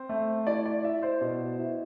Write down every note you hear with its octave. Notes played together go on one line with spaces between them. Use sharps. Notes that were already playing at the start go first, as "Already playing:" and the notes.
Already playing: C4 C5
A3
E4 D5
D5
E4 E5
C5
B2
E4